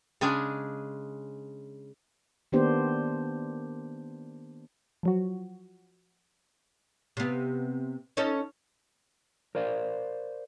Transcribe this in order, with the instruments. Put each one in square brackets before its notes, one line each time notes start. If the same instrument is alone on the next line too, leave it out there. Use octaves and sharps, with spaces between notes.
[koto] C#3 G#3 C#4 D4 G#4
[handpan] D#3 A#3 B3 D4 G4 C5
[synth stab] F3 F#3 F#4
[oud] C3 B3
C#4 D#4 A4
[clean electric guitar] A#4 C5 D5 F5